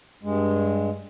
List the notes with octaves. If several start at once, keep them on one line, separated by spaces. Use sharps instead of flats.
G2 G#3